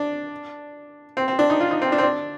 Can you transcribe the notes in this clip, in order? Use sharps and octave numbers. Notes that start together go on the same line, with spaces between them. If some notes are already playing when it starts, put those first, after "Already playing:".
Already playing: D4
C4
C4
D4
D#4
F4
D#4
C4
D4
C4
D4